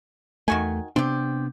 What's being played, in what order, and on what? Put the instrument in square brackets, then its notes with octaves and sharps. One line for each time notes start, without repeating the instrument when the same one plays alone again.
[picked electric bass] E2 A3 [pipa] D#3 F#4 G#5
[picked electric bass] C3 B3 D4 [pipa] C4 G4